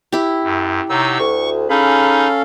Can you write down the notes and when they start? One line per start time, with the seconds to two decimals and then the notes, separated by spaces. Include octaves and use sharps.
0.12 E4 G4
0.44 F#2
0.89 C3 D#4 C#5 F#5 A#5 E6
1.18 D2 C#6
1.70 C#4 D#4 G#4 A4 F5 A#5 B5